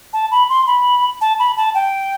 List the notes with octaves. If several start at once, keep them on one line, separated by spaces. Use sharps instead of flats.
A5
B5
C6
B5
A5
B5
A5
G5